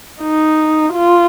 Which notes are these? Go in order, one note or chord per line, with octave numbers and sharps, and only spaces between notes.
D#4
F4